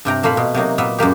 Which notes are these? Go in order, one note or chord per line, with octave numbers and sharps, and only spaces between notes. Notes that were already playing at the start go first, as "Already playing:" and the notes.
G2 C3 G5 A#5
A#2 A3 A#3 C5 F5 B5
B2
C3 F#3 A#3 D#4
A#2 A#3 B3 E5
F#2 G#3 A#3 G4